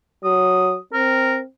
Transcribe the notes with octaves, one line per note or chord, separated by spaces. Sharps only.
F#3 D#6
C4 A#4